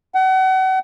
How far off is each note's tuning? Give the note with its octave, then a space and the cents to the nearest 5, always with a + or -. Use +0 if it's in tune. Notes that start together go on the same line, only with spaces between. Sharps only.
F#5 +35